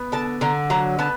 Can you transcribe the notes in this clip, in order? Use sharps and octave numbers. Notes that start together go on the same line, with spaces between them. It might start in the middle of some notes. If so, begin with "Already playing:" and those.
Already playing: B3
D3 A5
D3 A#5
F#3 A#5
B3 A5